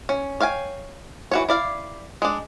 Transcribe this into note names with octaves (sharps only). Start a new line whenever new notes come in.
C#4
C#5 F5 G5 G#5
E3 F#4 C#5
E4 D5 F5
G#3 D4